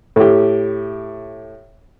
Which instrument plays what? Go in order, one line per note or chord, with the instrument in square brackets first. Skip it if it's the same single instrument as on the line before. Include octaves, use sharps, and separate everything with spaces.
[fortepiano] A2 G4